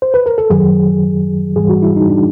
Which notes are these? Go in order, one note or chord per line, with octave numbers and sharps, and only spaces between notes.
C5
B4
A#4
A4
F#2 D#3 F#3 G#4
G#2 E3 G3 G#4
F#4
E4
D#4
D4